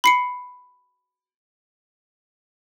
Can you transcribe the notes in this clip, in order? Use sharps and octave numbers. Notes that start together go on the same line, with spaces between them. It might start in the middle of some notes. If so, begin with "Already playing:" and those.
B5 C7 C#7